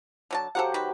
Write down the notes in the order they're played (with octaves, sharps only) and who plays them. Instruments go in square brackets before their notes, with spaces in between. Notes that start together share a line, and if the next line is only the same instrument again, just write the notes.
[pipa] D3 F#3 A5
[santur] F#3 G4 C5 [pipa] A4 F5 F#5
[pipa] D#3 F#4 B4